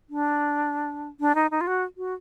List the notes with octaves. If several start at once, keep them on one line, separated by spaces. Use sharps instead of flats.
D4
D4
D#4
D#4
F4
F#4
F#4